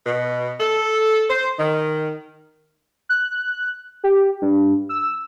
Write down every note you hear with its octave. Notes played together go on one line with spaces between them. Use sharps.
B2
A4
C5
D#3
F#6
G4
G2
E6